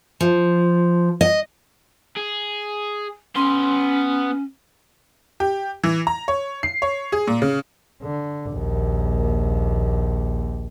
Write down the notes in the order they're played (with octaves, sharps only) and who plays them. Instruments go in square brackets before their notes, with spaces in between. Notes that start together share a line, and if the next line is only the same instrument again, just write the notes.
[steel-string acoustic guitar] F3
D#5
[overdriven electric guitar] G#4
[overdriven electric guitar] B3 C6 [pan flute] C#4
[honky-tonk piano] G4
E3
A#5
C#5
C7
C#5
G#4
A#2
C#3
[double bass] D3
A#1 D#2